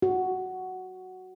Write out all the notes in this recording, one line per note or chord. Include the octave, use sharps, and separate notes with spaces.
F#4